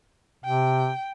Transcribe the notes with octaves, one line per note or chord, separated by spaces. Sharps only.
C3 G5